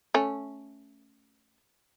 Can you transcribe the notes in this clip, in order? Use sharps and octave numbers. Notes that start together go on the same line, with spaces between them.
A3 C#4